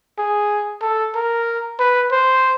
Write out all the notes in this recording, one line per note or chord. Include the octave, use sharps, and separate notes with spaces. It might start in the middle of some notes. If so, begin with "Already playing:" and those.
G#4
A4
A#4
B4
C5